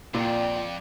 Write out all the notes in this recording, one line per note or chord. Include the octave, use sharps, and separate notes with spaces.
F2 A#2 F4 D5 G5